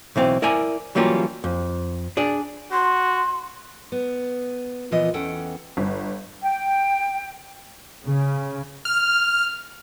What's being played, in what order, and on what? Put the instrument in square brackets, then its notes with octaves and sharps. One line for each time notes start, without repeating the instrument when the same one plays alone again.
[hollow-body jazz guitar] B1 E3 C4 F5
E4 A#4 D5 G#5
E3 F#3 G3 A#3 C#4 F4
F2
D4 G#4 D5
[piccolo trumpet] F#4 [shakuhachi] C6
[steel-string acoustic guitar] B3
A#2 E3 F3 B3 F4 D#5
E2 C#4 A4 F#5 G5
[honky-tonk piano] G1
[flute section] G5
[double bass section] C#3
[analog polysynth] F6